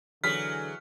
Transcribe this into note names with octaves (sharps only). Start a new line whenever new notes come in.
D3 E3 F#3 G#4 F6 B6